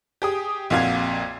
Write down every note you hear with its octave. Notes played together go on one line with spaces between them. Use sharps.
G4 G#4 D#6
A#1 F2 A#2 F#4 F5 G#6